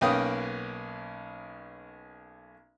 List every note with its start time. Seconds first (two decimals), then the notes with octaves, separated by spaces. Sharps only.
0.01 B1 A#3 C#4 B4 G5 D#6